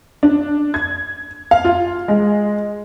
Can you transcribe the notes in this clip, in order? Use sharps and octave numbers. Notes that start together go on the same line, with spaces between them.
D4
G#6
F5
F4
G#3